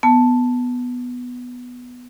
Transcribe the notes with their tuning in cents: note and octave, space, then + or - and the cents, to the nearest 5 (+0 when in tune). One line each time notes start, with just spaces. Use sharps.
B3 +0 A5 +0